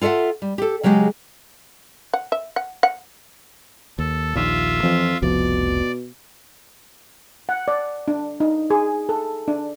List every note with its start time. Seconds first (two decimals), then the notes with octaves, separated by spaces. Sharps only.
0.01 F4 A4 D5 E5 F#5
0.42 G3
0.58 G4 A4
0.83 C#3 F#3 G#3 G4 G#4
2.13 F#5
2.32 E5
2.56 F#5
2.83 F#5
3.99 D#2 A4
4.36 A#1 D#2 A#2 F4 E5
4.83 F2 E3 F3
5.22 F1 C2 B2 F3 D5
7.49 F#5
7.68 D5
8.08 D4
8.40 D#4
8.70 G#4
9.09 A4
9.48 D4